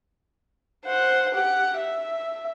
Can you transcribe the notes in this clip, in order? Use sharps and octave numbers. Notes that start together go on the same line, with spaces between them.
C5 F#5
G4 F#5
E5